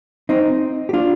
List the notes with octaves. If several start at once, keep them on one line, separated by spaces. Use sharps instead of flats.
C4 D#4
G4
D4 F4